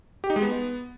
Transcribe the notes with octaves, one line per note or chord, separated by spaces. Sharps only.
G4
D#4
G#3
B3